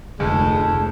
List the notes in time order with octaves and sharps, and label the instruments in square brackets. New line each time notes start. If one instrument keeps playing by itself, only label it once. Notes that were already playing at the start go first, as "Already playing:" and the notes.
[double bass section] F1 [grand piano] D2 [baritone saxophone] G#3 [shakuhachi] A5